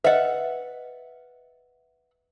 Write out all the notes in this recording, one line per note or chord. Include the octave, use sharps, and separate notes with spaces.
B4 D#5 E5 F#5